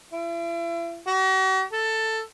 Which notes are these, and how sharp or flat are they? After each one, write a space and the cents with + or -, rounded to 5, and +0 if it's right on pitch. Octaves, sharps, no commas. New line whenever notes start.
E4 +40
F#4 +45
A4 +10